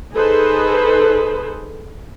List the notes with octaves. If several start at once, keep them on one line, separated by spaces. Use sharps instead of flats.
D#4 G#4 A4 B4 C5